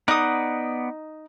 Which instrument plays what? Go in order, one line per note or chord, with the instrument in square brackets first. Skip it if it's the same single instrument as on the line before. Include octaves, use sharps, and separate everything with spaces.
[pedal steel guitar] B3 D5 F#5 [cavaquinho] D#4 D#6